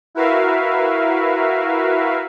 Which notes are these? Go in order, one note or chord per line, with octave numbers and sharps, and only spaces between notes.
E4 F#4 A#4 B4 E5 F5